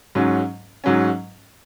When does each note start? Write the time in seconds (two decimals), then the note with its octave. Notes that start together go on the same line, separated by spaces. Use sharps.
0.15 G#2 F#3 C#4
0.84 G#2 F#3 C#4